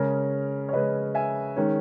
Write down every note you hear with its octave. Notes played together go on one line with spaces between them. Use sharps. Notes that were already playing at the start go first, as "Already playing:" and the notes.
Already playing: C#3 G#3 C#4 A#4
C#5
C#3 G#3 C#4 B4 D#5
E5 G#5
D#3 G#3 C#4